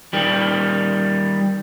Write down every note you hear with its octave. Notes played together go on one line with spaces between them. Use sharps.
D#3 G3